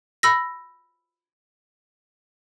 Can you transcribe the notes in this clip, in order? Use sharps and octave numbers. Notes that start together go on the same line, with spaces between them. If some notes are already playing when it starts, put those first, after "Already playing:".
B5 E6 A#6